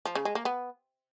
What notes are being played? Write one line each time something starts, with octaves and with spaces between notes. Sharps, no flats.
F3
C#3
G#3
A#3
B3